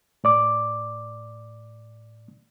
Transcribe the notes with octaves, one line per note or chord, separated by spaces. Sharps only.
A2 D5 D6